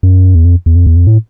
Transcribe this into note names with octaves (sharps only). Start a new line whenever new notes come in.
F#2
E2
F2
E2
F2
E2
F2
A2